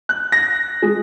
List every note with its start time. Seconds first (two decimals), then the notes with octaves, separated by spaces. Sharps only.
0.09 F#6
0.32 A#6
0.82 G#3